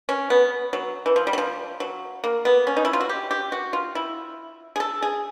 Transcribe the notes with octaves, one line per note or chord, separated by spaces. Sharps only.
C#4
B3
F#3
E3
F3
G3
F#3
F3
F#3
A#3
B3
C#4
D#4
E4
F4
F#4
G4
G4
F#4
F4
E4
G#4
A4
G#4